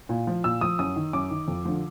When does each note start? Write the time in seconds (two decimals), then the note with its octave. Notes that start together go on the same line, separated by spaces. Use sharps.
0.09 A#2
0.27 F3
0.44 A#2 E6
0.61 F3 D#6
0.79 F#2 D#6
0.96 D#3
1.13 F#2 D6
1.31 D#3
1.48 F2
1.65 D3 F3